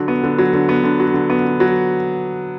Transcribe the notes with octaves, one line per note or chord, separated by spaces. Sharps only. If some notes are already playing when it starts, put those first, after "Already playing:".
Already playing: D3 F#3
B3
D3
F#3
D3
B3
D3
F#3
D3
B3
D3
F#3